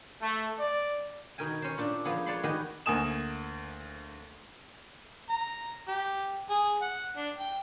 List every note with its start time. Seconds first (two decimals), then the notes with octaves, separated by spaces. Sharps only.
0.21 A3
0.59 D5
1.38 B2 D#3 A#4 G5 G#5
1.62 C#4 C5
1.78 A#2 D4
2.05 F3 A#3 B3 G#4
2.26 B4 C#5 D5 A5 B5 C6
2.44 D#3 B3 F#4 G4 D#5 G#5
2.86 D2 A#3 G#5 D#6 E7
5.29 A#5
5.88 G4
6.50 G#4
6.81 F#5
7.16 D4
7.38 G5